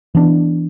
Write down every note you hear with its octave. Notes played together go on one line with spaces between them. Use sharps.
E3 B3 D4